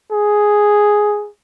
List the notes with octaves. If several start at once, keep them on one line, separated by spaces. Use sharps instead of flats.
G#4